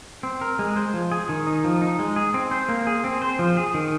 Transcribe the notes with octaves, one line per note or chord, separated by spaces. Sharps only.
C4
A#4
G#3
C5
F3
G#4
D#3
D#4
F3
D#4
G#3
G#4
C4
C5
A#3
G#4
C4
C5
F3
G#4
D#3